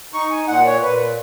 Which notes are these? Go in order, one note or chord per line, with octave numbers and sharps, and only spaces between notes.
D#4 C#6
G#5
A#2 F#5
C#5
A#2 B4